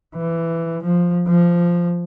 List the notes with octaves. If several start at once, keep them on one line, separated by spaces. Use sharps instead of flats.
E3
F3
F3